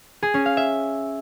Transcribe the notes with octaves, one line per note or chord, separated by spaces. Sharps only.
G#4
C#4
F5
E5